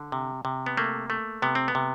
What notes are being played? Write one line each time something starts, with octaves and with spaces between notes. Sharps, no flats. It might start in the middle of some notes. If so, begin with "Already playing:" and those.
Already playing: D3
C3
C3
B3
A3 A#3
A3
C3 B3
C4
B3
C3